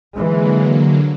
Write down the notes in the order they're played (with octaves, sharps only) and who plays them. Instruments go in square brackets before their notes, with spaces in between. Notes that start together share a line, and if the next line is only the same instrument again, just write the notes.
[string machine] D3 F#3 A#3 [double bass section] E3 G#3